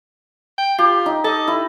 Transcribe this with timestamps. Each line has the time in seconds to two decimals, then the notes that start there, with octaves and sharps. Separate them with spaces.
0.58 G5
0.79 F4 G4
1.06 D#4
1.24 A4 D#5
1.48 E4